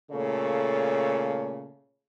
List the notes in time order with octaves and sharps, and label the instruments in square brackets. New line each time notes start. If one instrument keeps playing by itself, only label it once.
[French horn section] A#2 C#3 A3 A4 C#5